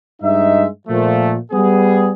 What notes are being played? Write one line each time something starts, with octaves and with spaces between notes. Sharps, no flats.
G2 G#3 D#4 E5
A#2 F3 A3
G3 B3 G#4